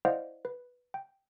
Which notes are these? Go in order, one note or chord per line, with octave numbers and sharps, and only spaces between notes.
E4 C5 D5 D#5 F5 F#5
B4
G5